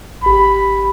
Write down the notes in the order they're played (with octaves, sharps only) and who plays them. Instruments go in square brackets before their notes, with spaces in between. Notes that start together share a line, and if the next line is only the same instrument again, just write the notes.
[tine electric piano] G#1 G4 [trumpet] B5